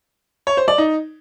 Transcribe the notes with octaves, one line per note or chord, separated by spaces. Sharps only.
C#5
C5
D5
D#4